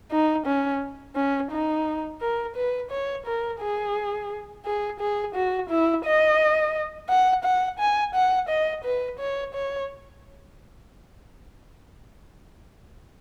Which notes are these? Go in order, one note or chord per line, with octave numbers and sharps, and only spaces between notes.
D#4
C#4
C#4
D#4
A#4
B4
C#5
A#4
G#4
G#4
G#4
F#4
E4
D#5
F#5
F#5
G#5
F#5
D#5
B4
C#5
C#5